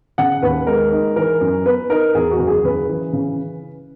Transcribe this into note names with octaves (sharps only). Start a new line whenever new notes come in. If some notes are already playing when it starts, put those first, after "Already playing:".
C#3 F#5
D#2 B4
G#3 A#4
D#4
E3 A#4
F#2
B3 B4
D#4 A#4
E2 G#4
F#4
F#1
G#4
C#3 B4
E3
C#3